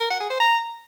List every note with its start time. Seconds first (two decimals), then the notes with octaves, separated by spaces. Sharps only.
0.01 A#4
0.10 F#5
0.20 G#4
0.30 C5
0.40 A#5